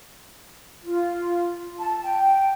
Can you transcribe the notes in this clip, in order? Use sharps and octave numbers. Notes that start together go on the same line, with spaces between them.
F4
A5
G5